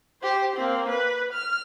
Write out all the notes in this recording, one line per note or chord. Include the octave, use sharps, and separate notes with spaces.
G4 C5
A#3 C4
B4
F6